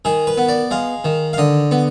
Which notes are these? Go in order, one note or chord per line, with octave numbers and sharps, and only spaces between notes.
D#3 G#4
B4
B3
D5
G#3 F5
D#3
F5
D3 D#5
B3